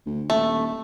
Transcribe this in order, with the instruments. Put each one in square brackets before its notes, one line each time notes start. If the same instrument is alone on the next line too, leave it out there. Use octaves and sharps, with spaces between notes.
[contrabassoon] D2
[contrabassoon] D#1 [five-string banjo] A3